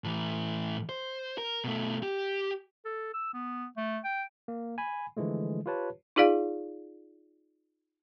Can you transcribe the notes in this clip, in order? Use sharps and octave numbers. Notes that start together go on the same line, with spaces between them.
A2 E3
C5
A#4
B2 A3
G4
A4
E6
B3
A3
G5
A#3
G#5 B5
D3 E3 F3 G#3 A3
F4 G4 B4 C#5 A5
D#4 F4 G#4 D5 F5